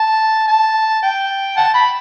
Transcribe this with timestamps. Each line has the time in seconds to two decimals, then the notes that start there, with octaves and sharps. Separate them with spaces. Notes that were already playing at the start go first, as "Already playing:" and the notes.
Already playing: A5
0.48 A5
1.03 G5
1.57 F#5 A5
1.74 B5